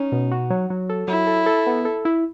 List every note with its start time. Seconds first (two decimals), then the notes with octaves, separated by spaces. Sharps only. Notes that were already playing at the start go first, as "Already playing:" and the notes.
Already playing: C#4 D#4
0.12 B2
0.31 F#4
0.50 F#3
0.70 F#3
0.89 A4
1.08 F#3 E4
1.27 A4
1.46 A4
1.67 B3
1.85 A4
2.05 E4